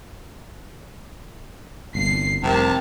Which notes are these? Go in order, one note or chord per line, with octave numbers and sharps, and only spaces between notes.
G1 C2 A#2 C7
F1 C2 C3 A#4 A5